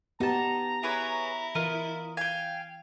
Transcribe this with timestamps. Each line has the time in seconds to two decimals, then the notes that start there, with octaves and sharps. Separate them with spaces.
0.20 B3 D#4 G4 A5 A#5
0.83 E4 G#4 B4 C#5
1.55 E3 F4 A#4 D#5
2.17 F5 G5 G#5